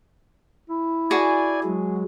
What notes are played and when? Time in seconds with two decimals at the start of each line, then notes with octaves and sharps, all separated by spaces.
0.70 E4
1.11 F#4 G#4 D5 G#5 A5
1.64 F#3 G#3